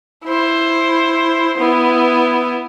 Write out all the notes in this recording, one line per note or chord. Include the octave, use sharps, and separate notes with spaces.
E4 C5
B3 E4